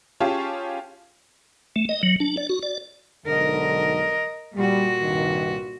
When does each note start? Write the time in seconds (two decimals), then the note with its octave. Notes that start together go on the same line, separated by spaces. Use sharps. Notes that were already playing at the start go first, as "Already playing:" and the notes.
0.20 C#4 F4 G4 G#4 F5 A5
1.76 A3
1.89 D#5
2.03 F#3
2.20 D4
2.37 D5
2.49 F#4
2.63 D5
3.26 B1 G#2 D3 A#4 D#5
4.55 A#2 G3 F#4
5.00 C2 G2 D#3